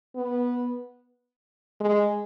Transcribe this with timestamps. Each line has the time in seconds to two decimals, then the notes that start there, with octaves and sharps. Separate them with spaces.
0.16 B3
1.80 G#3